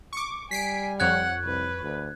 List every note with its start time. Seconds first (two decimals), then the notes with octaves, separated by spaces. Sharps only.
0.13 C#6 D6
0.51 G3 G#5 B6 C7 D7
1.00 F2 C#5 F#5 F#6 G#6
1.45 C2 B4
1.82 D2